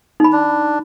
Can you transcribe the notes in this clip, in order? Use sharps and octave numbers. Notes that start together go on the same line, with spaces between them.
D#4 B5
D4